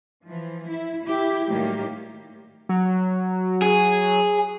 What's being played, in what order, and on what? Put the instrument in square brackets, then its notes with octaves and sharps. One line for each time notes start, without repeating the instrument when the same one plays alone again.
[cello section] E3 F3
E4
E4 G4
A2 D#3 F#3 G3 A#3 G4
[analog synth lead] F#3
[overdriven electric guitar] G#4